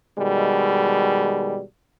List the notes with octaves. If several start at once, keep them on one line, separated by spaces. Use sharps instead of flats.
B2 D#3 G3 G#3